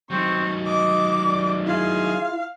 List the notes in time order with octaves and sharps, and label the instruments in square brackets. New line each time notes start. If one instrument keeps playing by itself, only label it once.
[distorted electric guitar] D#3 F#3 [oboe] C4 [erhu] C#6
[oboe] D#5 [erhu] D6
[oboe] D5
[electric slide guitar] E4 F4 [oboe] G#4 [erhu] F5